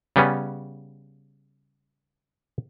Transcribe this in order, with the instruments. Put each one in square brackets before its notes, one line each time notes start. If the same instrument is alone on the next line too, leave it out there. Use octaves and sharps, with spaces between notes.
[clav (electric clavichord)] C#3 G3 B3 C#4